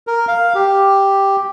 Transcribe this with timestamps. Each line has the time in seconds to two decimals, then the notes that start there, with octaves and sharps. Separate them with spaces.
0.07 A#4
0.28 F5
0.55 G4